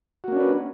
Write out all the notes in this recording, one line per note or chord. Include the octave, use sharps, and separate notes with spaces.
A#3 C#4 D4 F#4 B4